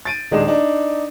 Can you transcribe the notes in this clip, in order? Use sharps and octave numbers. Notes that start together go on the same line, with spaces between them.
A6 D7 D#7
D#1 G#3 D4 D#4 E7
D4 D#4